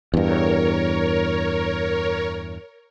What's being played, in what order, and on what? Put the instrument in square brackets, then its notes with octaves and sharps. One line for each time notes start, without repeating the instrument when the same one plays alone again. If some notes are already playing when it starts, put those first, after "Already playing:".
[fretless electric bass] E2 G2 [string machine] A#4 C#5